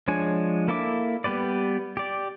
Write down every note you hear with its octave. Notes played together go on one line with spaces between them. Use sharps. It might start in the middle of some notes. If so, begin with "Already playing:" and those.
F3 G#3 D4 C#5 G#5
A#3 E4 A4 E5 D6
G3 B3 G4 B4 D5
G4 D5